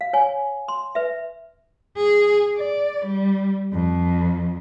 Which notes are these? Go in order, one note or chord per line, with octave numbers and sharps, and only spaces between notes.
F5
C#5 G#5
C6
B4 E5
G#4
D5
G3
F2